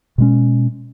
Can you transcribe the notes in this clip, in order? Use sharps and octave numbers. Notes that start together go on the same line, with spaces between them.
B2 G#3 C#4